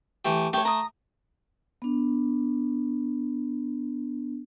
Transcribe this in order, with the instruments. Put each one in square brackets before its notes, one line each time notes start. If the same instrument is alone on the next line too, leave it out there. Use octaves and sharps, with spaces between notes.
[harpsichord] E3 A3 G4
[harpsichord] A3 [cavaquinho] G4 C#5
[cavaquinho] A#5 D#6
[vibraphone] B3 D4